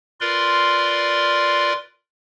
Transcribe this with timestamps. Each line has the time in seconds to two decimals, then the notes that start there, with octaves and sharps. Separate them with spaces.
0.21 F4 A#4 B4 D5 C6